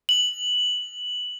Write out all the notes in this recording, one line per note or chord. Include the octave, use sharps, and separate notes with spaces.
F#7